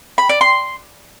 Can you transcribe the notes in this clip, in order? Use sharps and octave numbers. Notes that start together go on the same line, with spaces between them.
B5
D5
C6